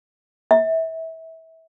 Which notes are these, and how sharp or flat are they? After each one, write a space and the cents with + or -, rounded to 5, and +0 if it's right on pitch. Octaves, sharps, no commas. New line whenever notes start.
E5 -25